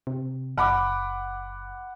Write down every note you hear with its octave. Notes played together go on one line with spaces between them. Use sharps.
C3
F#1 F#5 B5 D6